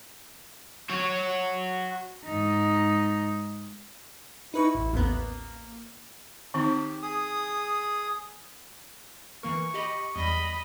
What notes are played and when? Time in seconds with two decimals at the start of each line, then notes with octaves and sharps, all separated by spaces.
0.89 F#4 C#5
2.26 G#2 D#4
4.54 D#4 E4 B4 C#6
4.75 A1
4.93 A1 D#2 A#3 B3
6.54 D#3 C4 D#4 G4
7.02 G#4 D#6
9.43 E3 A#3 A#4 C#6
9.74 G4 D#5 B5
10.16 E2 G3 D#5 B5 A#6